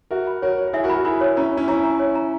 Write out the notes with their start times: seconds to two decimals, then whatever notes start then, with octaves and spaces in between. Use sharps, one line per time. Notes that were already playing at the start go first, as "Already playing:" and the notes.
0.11 F#4 A#4 E5
0.27 B5
0.42 F#4 A#4 C#5
0.58 C#5
0.68 A#4
0.73 E4 G#4 E5
0.84 F#4 A#4
0.90 B5
0.95 F#4 A#4
1.05 E4 G#4 B5
1.21 C#5
1.36 C#4 E4 A#5
1.53 C#4 E4 C#5
1.68 C#4 E4 A#5
1.84 A#5
2.00 C#5
2.15 A#5